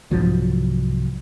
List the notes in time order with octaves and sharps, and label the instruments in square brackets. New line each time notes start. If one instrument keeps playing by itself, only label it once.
[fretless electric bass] C2 G#2 F3 F#3